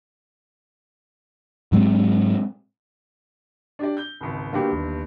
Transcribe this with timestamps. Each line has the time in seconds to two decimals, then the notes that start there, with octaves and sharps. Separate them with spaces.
1.72 G#2 F#3 G#3 C4
3.79 D4 G4 D5
3.97 G6 G7
4.21 G#1 C#2
4.53 G1 G2 A#3 F#4 G4
4.72 D#2